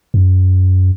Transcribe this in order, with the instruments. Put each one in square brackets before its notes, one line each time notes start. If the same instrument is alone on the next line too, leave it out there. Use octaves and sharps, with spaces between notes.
[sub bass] F#2